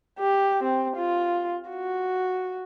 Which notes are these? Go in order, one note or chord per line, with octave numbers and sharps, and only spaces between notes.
G4
C4
F4
F#4